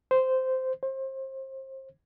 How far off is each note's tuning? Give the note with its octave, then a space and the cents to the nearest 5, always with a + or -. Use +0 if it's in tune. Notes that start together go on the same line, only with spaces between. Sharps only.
C5 -10
C5 +30